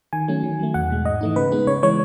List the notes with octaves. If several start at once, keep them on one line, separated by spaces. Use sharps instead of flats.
D#3 G#5
F#3 A3 C#4
D#3
F#3 A3
E2 F#5
B2 G#3
G#2 D#5
E3 A3 D#4
C#3 B4
G#3 B3 D#4
C#3 C#5
E3 G#3 C#5